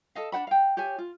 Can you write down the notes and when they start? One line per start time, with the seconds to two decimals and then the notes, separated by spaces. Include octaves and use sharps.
0.15 A4 D#5 F5
0.32 D4 C5 F#5 B5
0.47 F5 G5
0.77 G4 C#5 E5 G#5
0.98 F4